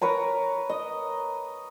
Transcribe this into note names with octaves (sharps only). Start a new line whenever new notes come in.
A#4 B4 C#5 A#5
D#5